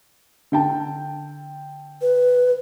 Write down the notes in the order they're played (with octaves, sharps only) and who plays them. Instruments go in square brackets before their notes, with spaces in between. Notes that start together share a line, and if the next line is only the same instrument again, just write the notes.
[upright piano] D3 G5 A5
[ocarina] B4